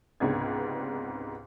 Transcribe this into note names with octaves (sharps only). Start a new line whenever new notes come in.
C#2 G#2 C3 B3 D4 G#6